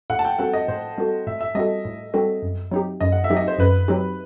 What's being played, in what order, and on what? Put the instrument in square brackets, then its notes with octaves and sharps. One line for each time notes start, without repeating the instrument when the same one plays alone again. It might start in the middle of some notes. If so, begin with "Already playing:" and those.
[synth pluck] A2 [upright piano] F#5
[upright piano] A5
G5
[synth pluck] G3 C4 F#4 A4 [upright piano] F#5
[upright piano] D#5
[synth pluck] A2 [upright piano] C5
[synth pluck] G3 C4 F#4 A4
[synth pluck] A2 [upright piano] E5
[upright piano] E5
[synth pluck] G3 C4 F#4 A4 [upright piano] D#5
[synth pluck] A2
G3 C4 F#4 A4
F#2
F#3 C4 D#4 G4
[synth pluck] F#2 [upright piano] D#5
[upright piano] F#5
E5
[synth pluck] F#3 C4 D#4 G4
[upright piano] D#5
C5
[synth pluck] F#2 [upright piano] B4
[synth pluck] F#3 C4 D#4 G4